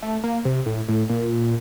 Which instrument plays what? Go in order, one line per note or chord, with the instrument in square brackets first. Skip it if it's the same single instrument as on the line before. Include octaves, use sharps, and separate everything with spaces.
[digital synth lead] A3
A#3
C3
A2
A2
A#2